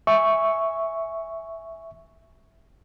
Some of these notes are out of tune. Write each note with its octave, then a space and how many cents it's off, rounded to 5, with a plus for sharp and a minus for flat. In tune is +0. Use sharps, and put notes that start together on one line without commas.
E5 +0 G#5 +0 C#6 +0